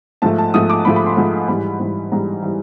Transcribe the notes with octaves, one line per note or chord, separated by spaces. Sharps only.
G#2 F3 A3 A5
A5
G#2 F3 A3 D#6
D6
G#2 F3 A3 B5
B5
C6
G#2 F3 A3
G#2 E3 G3 B5
G#2 E3 G3
G#2 E3 G3 A#5
E3 G3